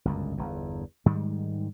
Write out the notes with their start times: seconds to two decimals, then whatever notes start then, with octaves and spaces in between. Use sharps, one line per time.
0.05 G1 C#2 F#2
0.37 G1 E2
1.06 G#2 D#3 G3 G#3